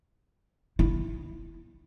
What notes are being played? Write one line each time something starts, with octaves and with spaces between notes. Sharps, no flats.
E4